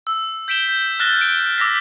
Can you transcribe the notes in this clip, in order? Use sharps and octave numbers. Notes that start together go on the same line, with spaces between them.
E6
G6 B6 D7 E7 G7
G6
F6 F#6 A6 A#6 E7 G7
D7 G7
D6 E6 A#6 B6